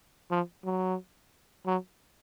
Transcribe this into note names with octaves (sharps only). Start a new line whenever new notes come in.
F3
F#3
F#3